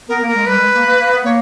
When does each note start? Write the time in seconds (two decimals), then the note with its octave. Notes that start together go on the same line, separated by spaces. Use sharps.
0.08 B3 A#4
0.22 A#3
0.28 A#4
0.34 G#3
0.46 G3 B4
0.59 G#3
0.74 A#3
0.85 A#3
0.99 A#3
1.12 B3
1.24 A#3 C#5